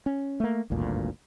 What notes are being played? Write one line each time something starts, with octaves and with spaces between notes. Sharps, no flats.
C#4
A3 A#3
G#1 D2 G2 A#2